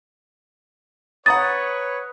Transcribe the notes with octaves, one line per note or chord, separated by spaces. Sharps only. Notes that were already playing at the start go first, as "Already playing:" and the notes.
B4 C#5 F#5 A#5 D#6 A6